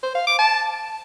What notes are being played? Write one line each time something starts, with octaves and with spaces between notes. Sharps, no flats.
C5
F5
D6
A5